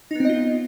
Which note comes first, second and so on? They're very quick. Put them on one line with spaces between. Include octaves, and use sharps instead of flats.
D#4 B3 C4 D#5 F4